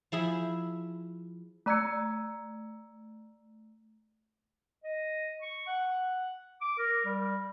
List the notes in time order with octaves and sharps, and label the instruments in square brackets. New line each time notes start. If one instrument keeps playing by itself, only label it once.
[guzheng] F3 E4 G#4 B5
[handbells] A3 D5 A#5 E6 G#6 C#7
[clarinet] D#5
C#6
F#5
D6
A#4
G3